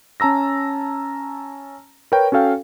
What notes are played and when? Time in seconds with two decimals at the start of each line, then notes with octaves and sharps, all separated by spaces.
0.20 C#4 A5 A#5 E6 A#6
2.12 A#4 B4 C#5 G5
2.32 C#4 F#4 A4 F5 G5